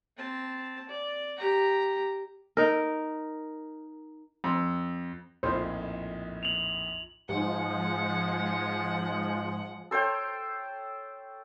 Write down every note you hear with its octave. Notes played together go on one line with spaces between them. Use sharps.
C4 A5
D5
G4 A#5
D#4 A#4
F2
A#1 F2 A2 D#4 F4 C5
F7 F#7
G#2 F3 G#3 F#5
A4 C5 C#5 G5